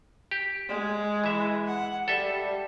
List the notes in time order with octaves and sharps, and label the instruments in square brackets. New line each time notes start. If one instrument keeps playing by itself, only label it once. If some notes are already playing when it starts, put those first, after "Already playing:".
[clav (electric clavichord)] G4
[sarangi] G#3
[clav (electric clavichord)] E3 E5
[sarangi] F#5
[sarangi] G3 [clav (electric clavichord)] A4 E5